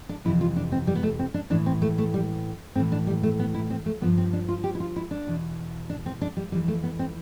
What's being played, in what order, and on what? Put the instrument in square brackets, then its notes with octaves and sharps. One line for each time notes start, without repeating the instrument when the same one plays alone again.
[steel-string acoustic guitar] D4
F2 C3 E3 E4
F4
D4
C4
G3
B3
A3
C4
D4
A2 E3 D4
C4
A3
A3
G3
A2 E3 C4
D4
G3
A3
B3
E4
C4
A3
G2 F3 B3
C4
D4
F4
G4
E4
F4
E4
D4
E2 B2
D4
C4
D4
G3
F2 E3 G3
A3
B3
C4